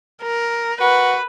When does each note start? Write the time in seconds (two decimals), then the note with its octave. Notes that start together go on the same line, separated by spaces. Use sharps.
0.23 A#4
0.80 F#4 B4